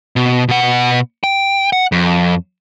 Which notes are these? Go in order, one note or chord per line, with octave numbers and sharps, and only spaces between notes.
B2
B2 F#5
G5
F#5
F2